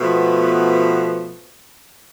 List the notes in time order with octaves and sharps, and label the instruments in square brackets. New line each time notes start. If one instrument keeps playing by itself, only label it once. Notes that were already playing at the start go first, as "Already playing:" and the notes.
[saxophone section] B2 F3 A3 B3